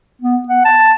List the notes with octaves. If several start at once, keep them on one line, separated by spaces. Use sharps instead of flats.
B3
F#5
A5